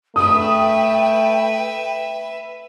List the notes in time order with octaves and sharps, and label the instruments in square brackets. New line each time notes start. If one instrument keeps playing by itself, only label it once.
[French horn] A3 [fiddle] B4 E5 [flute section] G5 [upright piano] D#6